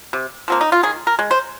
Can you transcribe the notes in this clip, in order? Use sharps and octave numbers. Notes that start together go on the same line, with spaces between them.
C3
F3 A#3 C4
D#4
F4
D#3 G#4
A#4
G#3
C5